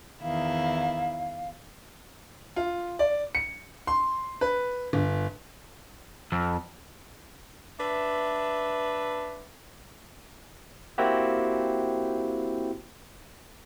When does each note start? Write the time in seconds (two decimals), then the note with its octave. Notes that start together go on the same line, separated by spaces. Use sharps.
0.22 E2 D#3 E4 F5
2.56 F4
2.99 D5
3.35 C#7
3.87 C6
4.41 B4
4.93 G1
6.32 F2
7.79 D4 B4 E5
10.98 A#3 C4 E4 F#4 G4